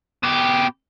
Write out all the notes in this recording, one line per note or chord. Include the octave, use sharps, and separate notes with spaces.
B2 G4